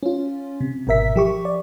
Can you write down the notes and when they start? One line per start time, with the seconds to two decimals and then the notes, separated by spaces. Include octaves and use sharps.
0.03 C#4 F4
0.61 C3
0.87 G#1 B2 A#4 E5 B6
1.16 F3 G4 C#6
1.45 D5